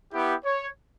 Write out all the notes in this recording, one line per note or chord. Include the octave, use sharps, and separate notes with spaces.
B3 E4 G4
C#5